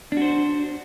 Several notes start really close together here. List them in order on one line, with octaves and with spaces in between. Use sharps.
D4 F#4 C5